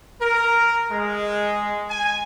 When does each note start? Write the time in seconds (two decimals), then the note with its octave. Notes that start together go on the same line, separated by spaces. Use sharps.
0.21 A#4
0.91 G#3
1.90 G#5